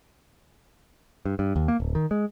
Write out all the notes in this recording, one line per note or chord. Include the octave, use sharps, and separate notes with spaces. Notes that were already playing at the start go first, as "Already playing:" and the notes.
G2
G2
D#2
A#3
D1
D#3
G#3